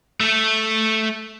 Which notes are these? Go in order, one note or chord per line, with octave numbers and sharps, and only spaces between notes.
A3 A4